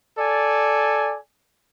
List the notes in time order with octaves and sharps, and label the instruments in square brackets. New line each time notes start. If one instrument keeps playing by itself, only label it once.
[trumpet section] A4 D5 G#5